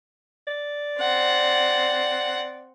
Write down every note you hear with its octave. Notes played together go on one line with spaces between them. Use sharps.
D5
C4 F#5